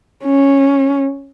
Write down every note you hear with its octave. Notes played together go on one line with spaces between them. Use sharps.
C#4